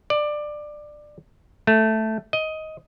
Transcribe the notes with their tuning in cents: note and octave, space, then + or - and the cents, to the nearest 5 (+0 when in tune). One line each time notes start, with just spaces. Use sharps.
D5 +20
A3 +0
D#5 +10